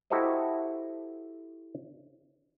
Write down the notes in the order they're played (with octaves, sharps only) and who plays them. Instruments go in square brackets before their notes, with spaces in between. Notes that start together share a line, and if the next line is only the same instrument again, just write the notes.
[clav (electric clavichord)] E4 F#4 G4 A4 C5 D#5